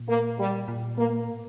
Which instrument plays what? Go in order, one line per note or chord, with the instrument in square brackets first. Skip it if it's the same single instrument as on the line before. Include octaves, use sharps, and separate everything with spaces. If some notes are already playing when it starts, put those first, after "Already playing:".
Already playing: [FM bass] A#2
[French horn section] A#3
G3
[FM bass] A#2
[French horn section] A#3
[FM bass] A2